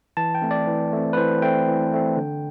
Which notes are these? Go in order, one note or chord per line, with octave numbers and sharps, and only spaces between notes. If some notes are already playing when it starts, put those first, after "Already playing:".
E3 A5
G5
A3 C4
D5
E3
A3 C4
B4
E3 C5
A3 C4 G5
E3
A3 C4
D3